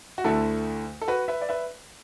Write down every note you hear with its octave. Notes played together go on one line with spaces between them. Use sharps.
F#4
D2 D3 A3 E4 A4
A4
F#4 B4
B4 E5
D5
B4 E5